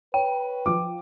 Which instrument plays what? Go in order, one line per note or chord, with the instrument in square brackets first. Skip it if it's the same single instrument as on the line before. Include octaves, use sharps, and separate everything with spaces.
[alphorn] B4 [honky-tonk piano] C#5 [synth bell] G5
[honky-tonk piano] F3 [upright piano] D6